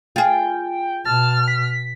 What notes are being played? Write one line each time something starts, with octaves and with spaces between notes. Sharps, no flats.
F4 G#4 G5
B2 A5 F6
B6